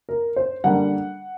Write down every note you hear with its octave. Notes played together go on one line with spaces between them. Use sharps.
A#4
C5
D3 G3 A#3 D4 F#5